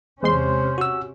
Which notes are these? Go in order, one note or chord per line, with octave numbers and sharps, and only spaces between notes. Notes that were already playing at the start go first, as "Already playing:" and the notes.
E2 C3 G#3 C#4 C5 C6
F#4 E6